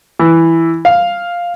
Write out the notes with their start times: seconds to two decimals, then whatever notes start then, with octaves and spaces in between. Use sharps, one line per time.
0.19 E3
0.85 F5